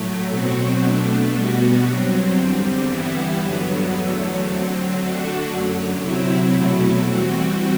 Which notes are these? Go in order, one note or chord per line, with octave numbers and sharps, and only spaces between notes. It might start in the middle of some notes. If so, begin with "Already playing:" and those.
Already playing: A2 F#3 A3
B2 F#3 C4 F#4
B2 A3 D4
B2 G3 B3 F#4
G2 F#3 C4
E2 D3 G3 C4
G2 E3 G3 B3 E4
G2 D3 F#3 B3
E2 D3 F#3 A3
D3 F#3 C4
D3 A3 D4 F#4
F#2 D3 F#3
C3 F#3 C4 E4
E2 B2 F#3 A3 E4
E3 G3 C4 F#4